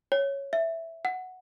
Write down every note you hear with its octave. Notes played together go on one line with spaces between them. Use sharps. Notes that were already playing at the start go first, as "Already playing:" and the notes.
C#5
E5
F#5